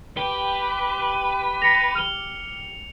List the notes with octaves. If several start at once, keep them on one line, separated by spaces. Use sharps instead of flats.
G4 B4 G7
A#6 B6 C#7 F7
F6 F7 G7